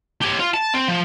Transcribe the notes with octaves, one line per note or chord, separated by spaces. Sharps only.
G4 C#5
F4
A5
C4
F3